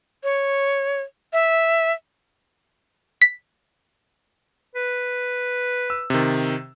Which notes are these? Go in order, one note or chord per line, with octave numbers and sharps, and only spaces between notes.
C#5
E5
B6
B4
E6
C3 D#3